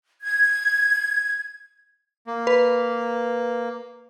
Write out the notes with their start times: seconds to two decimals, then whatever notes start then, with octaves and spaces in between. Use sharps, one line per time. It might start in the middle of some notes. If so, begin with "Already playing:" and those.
0.21 G#6
2.27 A#3
2.47 B4